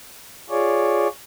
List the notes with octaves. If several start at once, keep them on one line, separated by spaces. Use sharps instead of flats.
F4 G#4 C#5 D5